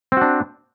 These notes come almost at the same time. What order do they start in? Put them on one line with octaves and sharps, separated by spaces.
C4 F#4 D4